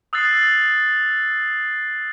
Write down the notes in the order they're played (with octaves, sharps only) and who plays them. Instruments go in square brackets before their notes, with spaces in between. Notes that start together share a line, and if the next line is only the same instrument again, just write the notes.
[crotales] D#6 E6 F#6 A6 C7